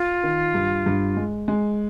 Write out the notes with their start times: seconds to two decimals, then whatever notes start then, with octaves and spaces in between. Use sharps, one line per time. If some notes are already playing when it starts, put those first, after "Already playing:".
Already playing: F4
0.23 D#3
0.54 G2
0.86 G2
1.17 G#3
1.48 G#3